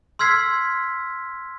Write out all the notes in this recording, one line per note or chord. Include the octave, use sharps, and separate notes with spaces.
C6 E6 F6 G#6 B6 C7